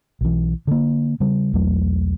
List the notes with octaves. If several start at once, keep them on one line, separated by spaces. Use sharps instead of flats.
B1 E3
D3 A#3
C#3 G3
B1 E2 F#3 A3